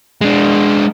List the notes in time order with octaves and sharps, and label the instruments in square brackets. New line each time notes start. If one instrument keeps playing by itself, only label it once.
[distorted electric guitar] G#3 D4